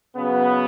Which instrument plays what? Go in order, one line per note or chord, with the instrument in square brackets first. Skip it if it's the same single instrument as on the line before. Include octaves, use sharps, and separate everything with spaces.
[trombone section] C#3 F#3 B3